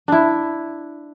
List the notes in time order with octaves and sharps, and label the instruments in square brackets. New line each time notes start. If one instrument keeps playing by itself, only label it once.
[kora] D4 E4